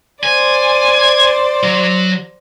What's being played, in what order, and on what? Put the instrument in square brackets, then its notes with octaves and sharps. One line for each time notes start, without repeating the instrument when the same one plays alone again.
[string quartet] C5 D5 [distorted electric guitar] G#5
[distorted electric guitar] F#3